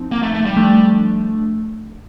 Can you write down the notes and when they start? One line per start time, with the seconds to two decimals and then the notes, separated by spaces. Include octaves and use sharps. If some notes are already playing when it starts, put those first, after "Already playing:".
Already playing: F3 C4 D#4
0.12 A#3
0.23 A3
0.34 A3
0.45 G3
0.56 F3 A3 D4